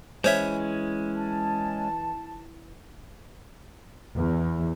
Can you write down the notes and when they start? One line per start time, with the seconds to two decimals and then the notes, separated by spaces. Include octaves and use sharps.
0.24 E3 G#3 C#4 C5 C#5 E5
1.16 A5
4.16 E2